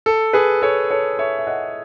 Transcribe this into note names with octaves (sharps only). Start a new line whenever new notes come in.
A4
G#4 B4
A4 C#5
A4 C#5
C#5 E5
E5
D#5 F#5